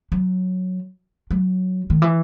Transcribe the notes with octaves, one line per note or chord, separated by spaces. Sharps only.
F#3
F#3
D#3
E3